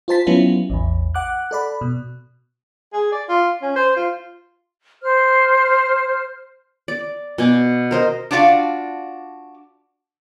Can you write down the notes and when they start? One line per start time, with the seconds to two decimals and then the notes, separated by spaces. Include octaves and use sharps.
0.08 F4 C5 A5 B6
0.27 F#3 B3 C#4 E4 F4
0.70 A1 E2
1.15 F#5 D6 F#6
1.51 A4 D5 B5
1.81 B2
2.93 G#4
3.12 D5
3.29 F4
3.62 C#4
3.76 C5
3.96 F4
5.01 C5 F6
6.88 D5
7.38 B2 G#5 D6
7.91 A#4 C5 D#5
8.31 D4 F4 F#4 D5 D#5 F5